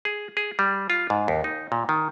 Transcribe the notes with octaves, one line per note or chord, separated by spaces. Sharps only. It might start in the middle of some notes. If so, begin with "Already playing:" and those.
G#4
G#4
G3
F4
G#2
D#2
D#4
A#2
D#3